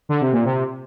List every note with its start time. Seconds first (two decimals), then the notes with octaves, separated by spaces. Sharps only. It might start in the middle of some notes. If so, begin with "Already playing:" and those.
0.09 D3
0.21 C3
0.32 A#2
0.45 C3